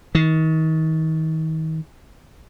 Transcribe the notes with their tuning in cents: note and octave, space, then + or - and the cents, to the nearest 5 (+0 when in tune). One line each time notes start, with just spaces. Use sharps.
D#3 +35